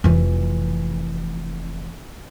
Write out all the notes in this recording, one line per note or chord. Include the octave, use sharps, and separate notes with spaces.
F1 E3